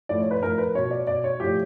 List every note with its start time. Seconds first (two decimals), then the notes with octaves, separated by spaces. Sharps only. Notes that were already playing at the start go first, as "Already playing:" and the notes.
0.09 A2 F3 D5
0.20 C#5
0.31 B4
0.42 A2 F3 A#4
0.58 B4
0.75 B2 C#5
0.91 D5
1.07 B2 D5
1.24 C#5
1.40 A2 F3 G4